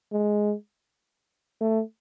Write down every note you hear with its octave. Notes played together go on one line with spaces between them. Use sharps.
G#3
A3